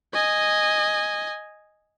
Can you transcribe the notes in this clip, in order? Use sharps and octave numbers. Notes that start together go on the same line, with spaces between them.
D#5 G#5